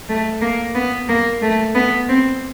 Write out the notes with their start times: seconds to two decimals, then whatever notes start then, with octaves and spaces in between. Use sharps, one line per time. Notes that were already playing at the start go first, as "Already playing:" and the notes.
0.09 A3
0.41 A#3
0.75 B3
1.09 A#3
1.42 A3
1.75 B3
2.09 C4